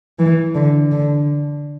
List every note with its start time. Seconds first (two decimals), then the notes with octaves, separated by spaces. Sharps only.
0.19 E3
0.55 D3
0.92 D3